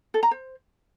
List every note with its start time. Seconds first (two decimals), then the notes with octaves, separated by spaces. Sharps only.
0.14 A4
0.23 A#5
0.31 C5